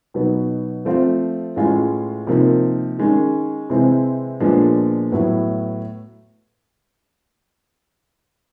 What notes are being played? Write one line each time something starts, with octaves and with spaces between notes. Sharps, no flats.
B2 F#3 B3 D#4
F3 A3 C4 F4
A2 E3 G#3 C#4 F4
C3 F3 A#3 D#4
D#3 G#3 C#4
C3 E3 G#3 C4
A#2 F3 G#3 B3 D4
A2 F#3 B3 E4